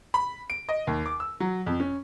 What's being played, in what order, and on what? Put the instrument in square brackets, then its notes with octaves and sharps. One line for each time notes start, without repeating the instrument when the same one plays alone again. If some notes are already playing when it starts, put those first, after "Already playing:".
[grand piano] B5
D7
D#5
D#2
D6
E6
F#3
F2
C#4